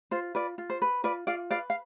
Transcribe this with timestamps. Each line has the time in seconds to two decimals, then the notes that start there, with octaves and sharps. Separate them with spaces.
0.11 F4 C5
0.35 F4 B4 D5
0.58 F4
0.70 C5
0.82 B4
1.04 F4 B4 D5
1.27 F4 D5 F5
1.51 B4 D5 F5
1.70 F5